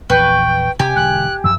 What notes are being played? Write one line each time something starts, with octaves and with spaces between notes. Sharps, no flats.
A#1 E2 B4 G5 C#6
C3 G4 G#5
E1 D3 G#3 F#6
F#2 F3 E6